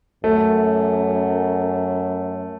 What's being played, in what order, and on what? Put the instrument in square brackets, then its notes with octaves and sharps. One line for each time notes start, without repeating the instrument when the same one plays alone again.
[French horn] F#2 [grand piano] A3